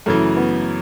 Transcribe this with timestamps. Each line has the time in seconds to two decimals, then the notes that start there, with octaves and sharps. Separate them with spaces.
0.06 F#2 C#3 E3 A3
0.37 B3